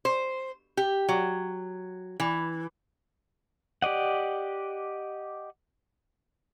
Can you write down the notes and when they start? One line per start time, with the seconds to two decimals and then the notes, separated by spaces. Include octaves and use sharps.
0.05 C5
0.77 G4
1.09 F#3
2.20 E3
3.82 G4 D5 D#5 F#5